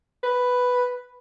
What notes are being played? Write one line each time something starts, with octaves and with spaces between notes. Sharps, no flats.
B4